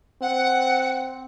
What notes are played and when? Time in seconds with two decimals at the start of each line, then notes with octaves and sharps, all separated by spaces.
0.22 C4 F#5